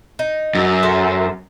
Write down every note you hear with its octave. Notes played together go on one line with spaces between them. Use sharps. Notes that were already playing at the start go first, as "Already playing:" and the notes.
D#4
F#2
A4 C5 E5